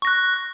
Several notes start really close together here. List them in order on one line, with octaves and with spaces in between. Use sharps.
C#6 A#6 F#6